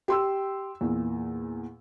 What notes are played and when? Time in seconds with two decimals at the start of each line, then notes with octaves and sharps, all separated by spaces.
0.08 G4 C6 E6
0.81 E2 A#2